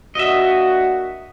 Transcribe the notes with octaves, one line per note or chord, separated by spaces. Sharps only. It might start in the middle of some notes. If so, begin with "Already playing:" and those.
A#3 D4 F#4 D#5 E5